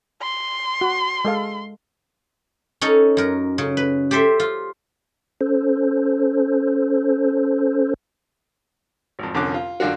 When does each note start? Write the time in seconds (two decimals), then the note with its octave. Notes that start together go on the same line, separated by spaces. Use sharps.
0.22 C6
0.81 F#4
1.25 G#3 A4 F5
2.81 C#4 D#4 A4
3.17 F#2 A#4
3.58 C#3
3.77 B4
4.11 G4 A4 C5 E5
4.40 F4
5.41 C#4 A4 C5
9.19 G#1 F2
9.34 C2 F2 D3 C#4 D6 F#6
9.54 F4
9.80 F#2 D3 D4 F4 F#4